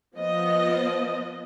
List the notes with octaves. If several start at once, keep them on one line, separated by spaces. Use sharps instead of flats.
F3 B3 D#5